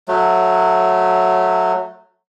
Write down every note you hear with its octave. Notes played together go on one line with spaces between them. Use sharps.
F#3 A3